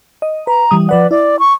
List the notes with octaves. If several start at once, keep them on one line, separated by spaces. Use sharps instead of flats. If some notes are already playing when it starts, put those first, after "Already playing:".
D#5
B4 A#5
E3 G3 D#6
F3 B4 D5 F#5
E4 D5
C#6